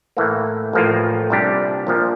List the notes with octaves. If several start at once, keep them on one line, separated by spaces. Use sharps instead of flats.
A2 E3 A#3
A1 A2 F3 A#3 F4
C2 A#2 G3 D4 G4
A#1 A#2 F3